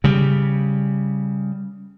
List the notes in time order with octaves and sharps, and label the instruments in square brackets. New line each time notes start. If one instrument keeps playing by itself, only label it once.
[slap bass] C#3 G3